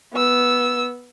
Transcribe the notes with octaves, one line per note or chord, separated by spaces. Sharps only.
B3 E6